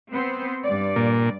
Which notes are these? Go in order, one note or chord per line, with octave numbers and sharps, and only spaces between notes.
B3 C4 C5
G2 D5
A#2